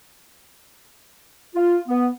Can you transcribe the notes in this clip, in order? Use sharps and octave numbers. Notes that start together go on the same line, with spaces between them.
F4
B3